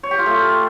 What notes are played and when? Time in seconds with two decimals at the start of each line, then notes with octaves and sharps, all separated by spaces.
0.03 C#5
0.11 G4
0.18 F4
0.26 A3